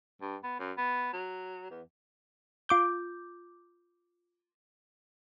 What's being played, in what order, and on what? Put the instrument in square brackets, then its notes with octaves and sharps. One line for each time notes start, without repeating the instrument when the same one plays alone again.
[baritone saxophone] G2
B3
F#2
B3
F#3
E2
[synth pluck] F4 D6 G6